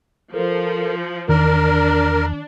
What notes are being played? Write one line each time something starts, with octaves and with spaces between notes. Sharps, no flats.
F3 A4 A#4
E2 D#3 D4 A#4